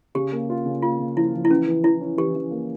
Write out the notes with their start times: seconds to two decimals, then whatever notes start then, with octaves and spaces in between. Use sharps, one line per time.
0.15 C#3 G4
0.32 A#3
0.50 F4
0.65 C#3
0.82 A#3 F4
0.99 C#3
1.16 F3 E4
1.34 F3
1.45 E4
1.50 E3 C#4
1.67 E3
1.84 E3 E4
2.01 C#4
2.17 E3 G4
2.35 E3
2.51 A#3